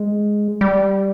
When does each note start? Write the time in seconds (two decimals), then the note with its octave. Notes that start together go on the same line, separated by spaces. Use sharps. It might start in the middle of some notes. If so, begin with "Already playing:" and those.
Already playing: G#3
0.61 G3